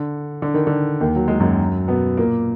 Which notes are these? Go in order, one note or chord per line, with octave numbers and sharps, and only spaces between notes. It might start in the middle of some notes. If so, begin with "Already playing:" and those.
Already playing: D3
D3
D#3
D3
D#2 D#3
F#3
G#3
F#2 F#3
B2 B3
A#2 A#3